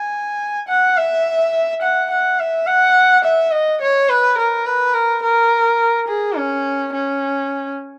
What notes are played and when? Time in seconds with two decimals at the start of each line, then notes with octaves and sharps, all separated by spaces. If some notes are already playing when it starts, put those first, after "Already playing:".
Already playing: G#5
0.68 F#5
0.97 E5
1.82 F#5
2.11 F#5
2.40 E5
2.67 F#5
3.24 E5
3.52 D#5
3.81 C#5
4.09 B4
4.38 A#4
4.66 B4
4.94 A#4
5.23 A#4
6.08 G#4
6.36 C#4
6.94 C#4